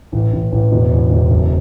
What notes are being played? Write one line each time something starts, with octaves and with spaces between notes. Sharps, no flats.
A1
A1
A1
E1
E2
E1
F#1